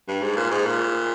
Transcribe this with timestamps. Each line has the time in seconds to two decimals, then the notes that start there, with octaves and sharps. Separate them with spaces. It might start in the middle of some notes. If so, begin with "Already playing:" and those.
0.08 G2
0.22 G#2
0.36 A#2
0.51 G#2
0.66 A#2